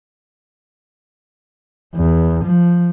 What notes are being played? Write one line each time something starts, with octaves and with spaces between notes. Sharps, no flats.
E2
F3